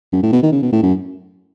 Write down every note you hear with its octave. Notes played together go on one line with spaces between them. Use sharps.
F#2
A2
B2
D#3
C#3
B2
A2
F#2